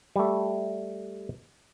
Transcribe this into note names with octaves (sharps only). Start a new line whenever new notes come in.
G3 A3